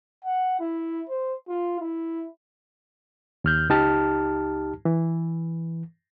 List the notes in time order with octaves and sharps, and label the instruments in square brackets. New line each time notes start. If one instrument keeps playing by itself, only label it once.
[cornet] F#5
E4
C5
F4
E4
[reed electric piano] D#2 F6 G6
C#2 D#4 G4 A5 F6
E3